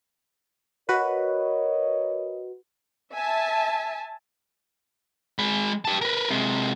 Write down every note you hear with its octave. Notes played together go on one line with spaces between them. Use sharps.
F#4 A#4 B4 C#5 D#5
E5 G#5 A5
G#3 B5
G4 A5
A#4 B4
C3 G#3